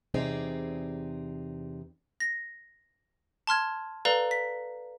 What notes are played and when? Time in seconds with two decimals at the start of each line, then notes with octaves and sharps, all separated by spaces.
0.14 E2 C3 C4 D#4 G#4 D5
2.20 A#6
3.47 A5 C6 F6 G#6
4.05 A4 B4 D5 F5 A#5
4.31 B6